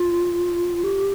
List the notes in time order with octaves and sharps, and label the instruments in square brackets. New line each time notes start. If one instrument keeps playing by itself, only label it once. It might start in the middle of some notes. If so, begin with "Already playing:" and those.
Already playing: [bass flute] F4
G4